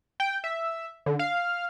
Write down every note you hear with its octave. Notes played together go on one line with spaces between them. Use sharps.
G5
E5
D3
F5